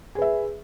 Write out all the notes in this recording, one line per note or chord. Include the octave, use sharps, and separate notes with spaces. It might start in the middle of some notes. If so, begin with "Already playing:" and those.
G#4 B4 E5